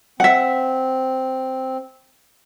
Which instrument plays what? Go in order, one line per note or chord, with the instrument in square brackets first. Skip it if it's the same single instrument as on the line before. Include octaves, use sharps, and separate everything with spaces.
[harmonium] C4 [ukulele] E5 F#5